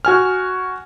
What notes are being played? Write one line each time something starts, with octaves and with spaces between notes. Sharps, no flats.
F#4 G#5 F6